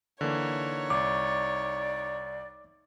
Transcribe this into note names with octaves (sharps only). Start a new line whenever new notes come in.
D3 E3 A#3 D#4 C#5
C2 D5 D6